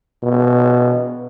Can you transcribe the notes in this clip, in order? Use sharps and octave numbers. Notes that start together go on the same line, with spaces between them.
B2